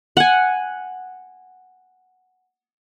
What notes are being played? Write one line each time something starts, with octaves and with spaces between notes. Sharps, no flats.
F#5 G#5